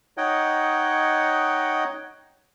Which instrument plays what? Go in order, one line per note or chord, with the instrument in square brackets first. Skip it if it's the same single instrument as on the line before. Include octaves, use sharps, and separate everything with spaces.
[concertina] D#4 C#5 D#5 F#5 G5